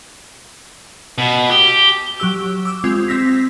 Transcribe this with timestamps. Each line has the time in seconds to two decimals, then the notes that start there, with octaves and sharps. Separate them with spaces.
1.18 B2
1.50 G4
2.20 F#3 G4 E6
2.65 D6 E6
2.84 G#3 C4 F4
3.08 C4 E6 A#6 B6